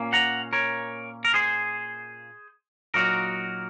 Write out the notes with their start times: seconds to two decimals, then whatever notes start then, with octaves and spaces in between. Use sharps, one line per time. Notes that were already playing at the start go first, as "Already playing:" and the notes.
Already playing: A#2 A#3 C#4
0.13 F#5 A#5
0.53 A#4 C#5
1.25 A#4
1.34 G#4 C5
2.94 A#2 F#3 A#3 D#4 F#4 A#4